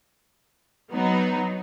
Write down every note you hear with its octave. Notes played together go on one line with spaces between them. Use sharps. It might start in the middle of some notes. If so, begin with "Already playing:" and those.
F#3 B3 D#4